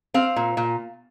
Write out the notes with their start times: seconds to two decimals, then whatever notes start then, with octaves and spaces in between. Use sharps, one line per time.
0.14 C4 F5
0.36 A#2
0.57 A#2